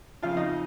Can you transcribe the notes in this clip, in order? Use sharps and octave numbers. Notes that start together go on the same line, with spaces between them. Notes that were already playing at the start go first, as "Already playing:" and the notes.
F2 C#3 F3 F4 F5
D#4 D#5